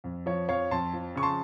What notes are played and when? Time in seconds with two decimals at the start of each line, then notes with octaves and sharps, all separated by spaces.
0.04 F2
0.26 F3 C#5
0.49 F2 C#5 F5
0.71 F2 A5 C6
0.93 F3
1.16 C#3 C#6
1.23 A5 C6